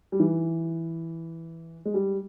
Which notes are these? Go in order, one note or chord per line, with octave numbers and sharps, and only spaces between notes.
G3
E3
G#3
G3